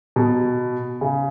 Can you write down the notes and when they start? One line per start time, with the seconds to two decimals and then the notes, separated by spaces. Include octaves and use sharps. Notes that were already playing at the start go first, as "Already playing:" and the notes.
0.16 B2
1.01 C#3